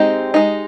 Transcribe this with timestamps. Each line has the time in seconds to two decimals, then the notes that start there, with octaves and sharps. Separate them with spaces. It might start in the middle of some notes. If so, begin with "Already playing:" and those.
Already playing: G#3 C4 D#4 G4
0.34 G#3 D#4